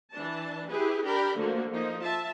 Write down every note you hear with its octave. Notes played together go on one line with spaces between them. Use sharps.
E3 D4 A5
E4 G4 G#4 B4
D4 G4 A#4 G5 B5
D3 F3 A3 A#3 F#4
F3 A#3 D#4
F4 E5 A5